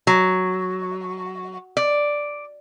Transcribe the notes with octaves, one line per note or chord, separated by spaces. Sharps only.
F#3
D5